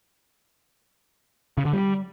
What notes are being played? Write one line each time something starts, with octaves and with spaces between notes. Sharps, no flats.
C#3
D3
G3